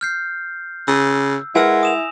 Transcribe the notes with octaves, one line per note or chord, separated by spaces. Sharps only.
F6 G6 C7
C#3 E6
G#3 E4 A#4 B4 F#5 G#5 E6 A#6
D#6 E7 F7